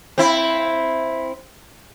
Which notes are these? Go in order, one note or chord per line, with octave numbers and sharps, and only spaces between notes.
C4 E4